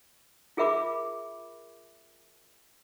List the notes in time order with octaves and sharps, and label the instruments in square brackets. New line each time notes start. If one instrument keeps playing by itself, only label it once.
[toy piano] F4 G#4 A#4 E5 B5 D6